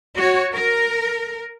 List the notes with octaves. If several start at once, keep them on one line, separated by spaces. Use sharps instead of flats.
F#4 C#5
A#4